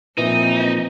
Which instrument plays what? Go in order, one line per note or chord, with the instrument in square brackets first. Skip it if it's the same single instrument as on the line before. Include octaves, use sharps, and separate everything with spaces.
[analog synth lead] A#2 [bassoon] E3 [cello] F3 C4 [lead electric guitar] D#4